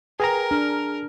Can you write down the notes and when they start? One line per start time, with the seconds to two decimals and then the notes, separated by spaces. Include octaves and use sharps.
0.20 G#4 A#4 B4 G5 G#5 A#5 A#6
0.51 D4 F6